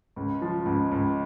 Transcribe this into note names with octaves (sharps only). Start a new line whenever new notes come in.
C#2
F3
C#2
C#2